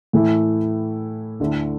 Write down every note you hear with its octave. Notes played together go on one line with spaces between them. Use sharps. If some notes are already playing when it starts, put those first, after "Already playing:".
A2 E3 A3 E4
D2 D3 A3 E4